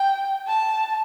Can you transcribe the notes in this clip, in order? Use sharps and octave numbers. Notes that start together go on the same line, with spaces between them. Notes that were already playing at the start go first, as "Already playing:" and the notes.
Already playing: G5
A5